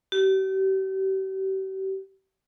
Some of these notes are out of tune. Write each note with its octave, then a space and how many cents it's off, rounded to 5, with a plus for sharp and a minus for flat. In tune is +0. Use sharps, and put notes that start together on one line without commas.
G4 -40